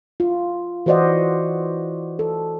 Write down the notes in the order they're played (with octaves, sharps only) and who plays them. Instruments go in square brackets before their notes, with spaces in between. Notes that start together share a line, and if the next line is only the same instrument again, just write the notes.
[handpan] F4
E3 F#4 C5 D5 D#5 F#5
A4